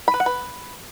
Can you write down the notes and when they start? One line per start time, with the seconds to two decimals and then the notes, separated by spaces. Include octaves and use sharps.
0.08 B5
0.14 B4
0.20 F#5
0.26 B4